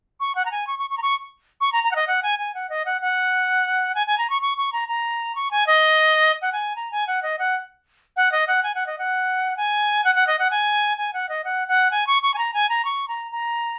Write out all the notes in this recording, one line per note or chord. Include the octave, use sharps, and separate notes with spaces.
C#6
F#5
A#5
G#5
C#6
C#6
C#6
A#5
C#6
C#6
A#5
A#5
F#5
D#5
F#5
G#5
G#5
F#5
D#5
F#5
F#5
G#5
G#5
A#5
C#6
C#6
C#6
A#5
A#5
C#6
G#5
D#5
F#5
G#5
A#5
G#5
F#5
D#5
F#5
F#5
D#5
F#5
G#5
F#5
D#5
F#5
G#5
F#5
F#5
D#5
F#5
G#5
G#5
F#5
D#5
F#5
F#5
G#5
C#6
C#6
G#5
A#5
G#5
A#5
C#6
A#5
A#5